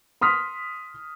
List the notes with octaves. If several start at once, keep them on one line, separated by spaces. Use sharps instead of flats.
C6 D#6 F6 B6